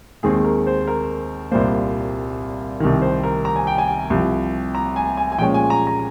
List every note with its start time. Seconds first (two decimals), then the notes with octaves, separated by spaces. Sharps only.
0.23 D#2 D#3 G#3 C4 G#4
0.44 A#4
0.67 C5
0.88 A#4
1.51 C2 A#2 G3 A#3 C5
2.80 C2 C3 D#3
3.02 C5
3.23 A#4
3.45 A#5
3.56 G#5
3.67 G5
3.78 G#5
4.10 C2 C3 F3
4.75 A#5
4.96 G#5
5.17 G#5
5.32 G#5
5.38 A#2 F3 G#3 C#4 G5
5.54 G#5
5.70 A#5
5.87 A#5